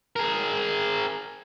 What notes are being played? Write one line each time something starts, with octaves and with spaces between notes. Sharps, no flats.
G#4 A#4